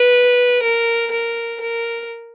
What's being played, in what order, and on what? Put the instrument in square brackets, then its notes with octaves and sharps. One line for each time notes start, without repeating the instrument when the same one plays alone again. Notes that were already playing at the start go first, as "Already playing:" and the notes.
Already playing: [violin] B4
A#4
A#4
A#4